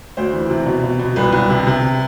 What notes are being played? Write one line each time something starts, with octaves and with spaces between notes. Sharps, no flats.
D2 C5
E3
C3
B2
B2
B2
C2 B4
C2
C3
C3